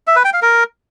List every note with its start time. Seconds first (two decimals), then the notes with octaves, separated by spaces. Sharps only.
0.07 E5
0.16 B4
0.25 G5
0.33 F5
0.42 A#4